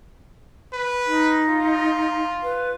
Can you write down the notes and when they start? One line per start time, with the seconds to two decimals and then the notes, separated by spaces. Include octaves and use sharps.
0.73 B4
1.07 D#4
1.49 F4
2.43 B4